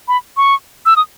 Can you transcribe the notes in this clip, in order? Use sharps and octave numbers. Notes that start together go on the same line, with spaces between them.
B5
C#6
E6
D#6